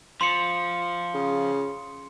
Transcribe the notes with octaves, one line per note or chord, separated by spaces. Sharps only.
F3 C6 C#7
C#3